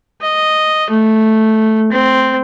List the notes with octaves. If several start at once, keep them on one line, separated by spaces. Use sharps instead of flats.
D#5
A3
C4